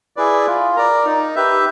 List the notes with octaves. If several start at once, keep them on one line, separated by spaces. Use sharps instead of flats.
E4 G#4 B4 D5
F4
A#4 D5
D#4
G4 B4 E5